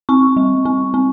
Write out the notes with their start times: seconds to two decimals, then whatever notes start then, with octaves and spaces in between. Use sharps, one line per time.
0.09 C4 C#6
0.37 G3
0.65 C4
0.94 C4